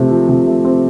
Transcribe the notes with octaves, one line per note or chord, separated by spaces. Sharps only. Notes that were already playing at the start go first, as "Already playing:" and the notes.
Already playing: C3 F3 A3 C4
F3
C3
A3
C4